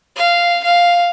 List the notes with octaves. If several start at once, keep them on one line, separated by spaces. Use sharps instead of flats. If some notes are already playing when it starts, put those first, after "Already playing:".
F5
F5